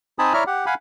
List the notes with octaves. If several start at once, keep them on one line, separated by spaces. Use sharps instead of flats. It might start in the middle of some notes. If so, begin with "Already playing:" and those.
C4 D#4 G#5 A5 B5 D#6
E4 C#5 D5 E5 A#5 F6
G4 F#5
F5 F#5 G#5 B5